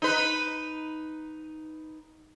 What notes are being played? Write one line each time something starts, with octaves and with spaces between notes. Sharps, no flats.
D#4 B4